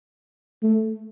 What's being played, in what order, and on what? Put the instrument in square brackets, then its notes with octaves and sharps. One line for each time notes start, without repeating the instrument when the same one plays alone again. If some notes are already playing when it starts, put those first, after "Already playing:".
[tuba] A3